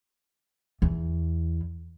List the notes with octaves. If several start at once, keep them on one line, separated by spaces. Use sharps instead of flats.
E2